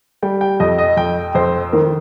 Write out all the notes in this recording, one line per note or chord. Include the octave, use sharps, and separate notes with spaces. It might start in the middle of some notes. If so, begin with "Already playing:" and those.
G3 G5
G5
F2 D#5
D#5
F2 G5
F2 C5
D#3 A#4